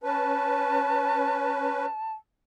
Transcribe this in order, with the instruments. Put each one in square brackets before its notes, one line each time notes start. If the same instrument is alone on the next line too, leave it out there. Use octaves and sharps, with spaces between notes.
[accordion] C#4 B4 [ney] A5